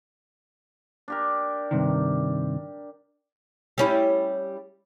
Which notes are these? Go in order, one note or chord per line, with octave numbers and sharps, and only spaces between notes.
D4 G4 A#4
G2 C3 D#3
G3 C#4 E4